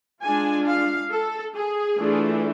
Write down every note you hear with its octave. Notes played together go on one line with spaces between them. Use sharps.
G#3 D4 F4 G#5
F5
A4
G#4
E3 A3 D4 F4